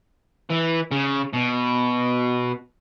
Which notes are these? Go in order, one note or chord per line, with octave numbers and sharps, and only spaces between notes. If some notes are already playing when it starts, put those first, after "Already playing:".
E3
C#3
B2